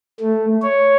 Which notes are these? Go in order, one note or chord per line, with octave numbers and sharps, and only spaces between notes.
A3
C#5